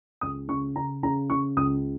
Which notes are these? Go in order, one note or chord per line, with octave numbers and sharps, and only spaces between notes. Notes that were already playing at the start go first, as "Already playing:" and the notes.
C#2 D#6
C#3 C#6
C#3 A#5
C#3 A#5
C#3 C#6
C#2 D#6